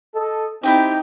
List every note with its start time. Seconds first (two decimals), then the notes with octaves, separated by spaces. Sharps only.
0.15 A4 D#5
0.63 C4 D#4 E4 G4 G5 D6